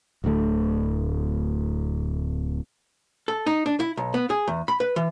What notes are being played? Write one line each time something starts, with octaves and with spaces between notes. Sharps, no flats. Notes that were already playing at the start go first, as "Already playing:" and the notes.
D1 D2 D3 A3
A4
D#4
D4
E4
B1
B3
G#4
E2
B5
B4
E3